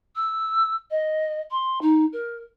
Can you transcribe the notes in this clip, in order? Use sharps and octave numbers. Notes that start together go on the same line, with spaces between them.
E6
D#5
C6
D#4
A#4